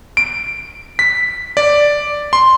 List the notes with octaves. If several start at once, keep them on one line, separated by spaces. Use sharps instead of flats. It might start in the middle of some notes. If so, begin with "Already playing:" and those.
D7
B6
D5
C6